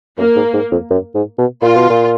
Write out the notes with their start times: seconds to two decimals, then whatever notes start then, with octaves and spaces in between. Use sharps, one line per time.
0.18 F#2 A#3
0.36 G#2
0.53 G#2
0.72 F2
0.90 F#2
1.15 G#2
1.38 B2
1.62 A#2 F4
1.75 B2
1.89 A#2